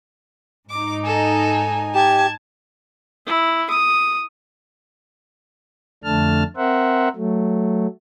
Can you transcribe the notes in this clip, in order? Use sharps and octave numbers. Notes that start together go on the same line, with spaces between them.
G#2 D#4 D6
A4 G#5
G4 A5 G#6
E4
D#6
F2 D3 A3 D4 A5 F6
C4 A#4 C5 E5 F#5
F#3 A3